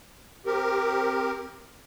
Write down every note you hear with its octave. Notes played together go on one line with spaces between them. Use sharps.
C4 G4 A#4